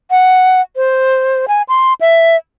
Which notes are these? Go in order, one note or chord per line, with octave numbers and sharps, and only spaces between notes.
F#5
C5
G#5
C6
E5